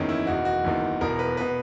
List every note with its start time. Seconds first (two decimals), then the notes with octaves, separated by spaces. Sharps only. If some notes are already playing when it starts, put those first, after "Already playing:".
Already playing: F#1 E2 D#3 C#4
0.09 E4
0.26 E1 E2 D#3 F#4
0.45 F#4
0.64 F#1 E2 D#3
1.01 E1 E2 B2 A#4
1.19 B4
1.37 B2 B4